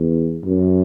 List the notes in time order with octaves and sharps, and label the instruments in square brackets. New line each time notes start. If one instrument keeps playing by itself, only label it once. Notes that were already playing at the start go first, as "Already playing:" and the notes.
Already playing: [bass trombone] E2
F#2